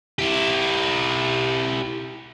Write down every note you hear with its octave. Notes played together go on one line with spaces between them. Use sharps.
E4 G4